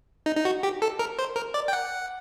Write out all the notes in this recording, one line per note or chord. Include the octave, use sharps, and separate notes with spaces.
D#4
D#4
F#4
G4
A4
A#4
C5
A#4
D5
G5
F#5